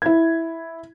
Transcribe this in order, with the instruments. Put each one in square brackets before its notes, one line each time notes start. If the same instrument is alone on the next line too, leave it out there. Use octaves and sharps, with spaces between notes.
[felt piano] E4 G#6